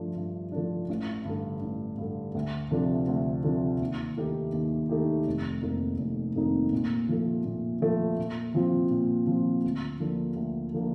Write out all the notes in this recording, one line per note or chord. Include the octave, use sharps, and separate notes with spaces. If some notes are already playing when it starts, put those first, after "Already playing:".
Already playing: G2 F3 A3 D4
G2
F3 A3 D4
A1
G2 D3
A1
G2 D3
D2
C3 F3 A3 D4
D2
C3 F3 A3 D4
D#2
D#3 A3 D#4 G4
D#2
D#3 A3 D#4 G4
F1
F2 D#3 A#3 D#4
F1
F2 D#3 A#3 D#4
A#2
F3 A3
A#2
F3 A3
A#2
F3 C4 F4
A#2
F3 C4 F4
D2
D3 F3 A#3 D4
D2
D3 F3 A#3 D4